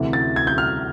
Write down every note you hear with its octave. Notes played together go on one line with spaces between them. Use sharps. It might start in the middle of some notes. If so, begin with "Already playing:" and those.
Already playing: D2 C3 E3
A6
G#6
G6
F6